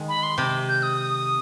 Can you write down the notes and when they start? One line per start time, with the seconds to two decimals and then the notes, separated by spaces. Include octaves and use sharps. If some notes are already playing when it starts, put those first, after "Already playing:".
Already playing: D#3 G#3
0.08 B5
0.23 C6
0.38 C3 D6
0.68 G6
0.83 D#6